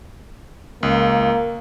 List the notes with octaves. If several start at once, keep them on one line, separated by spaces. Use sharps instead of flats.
C#2 A#3